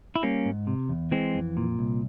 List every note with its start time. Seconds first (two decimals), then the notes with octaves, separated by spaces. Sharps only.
0.16 E4
0.23 G3 A#3 C#4
0.45 G#2
0.67 C3
0.89 E2
1.11 E3 G#3 C4
1.34 F2
1.57 A#2
1.79 C2